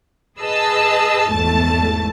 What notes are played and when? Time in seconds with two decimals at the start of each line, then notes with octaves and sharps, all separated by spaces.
0.38 G#4 B4 D#5 A5 E6
1.31 G#1 E2 A3 A5 A6